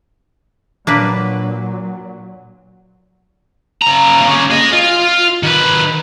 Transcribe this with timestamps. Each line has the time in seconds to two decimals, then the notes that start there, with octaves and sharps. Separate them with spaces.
0.87 A#2 F#3 A#3 D4 B4
3.82 C#3 A#5
4.21 A#3 C#4
4.51 G#4 D#5
4.73 F4
5.43 D#3 B4